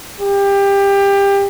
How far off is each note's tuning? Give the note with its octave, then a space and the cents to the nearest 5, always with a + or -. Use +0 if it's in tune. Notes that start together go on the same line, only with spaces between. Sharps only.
G4 +20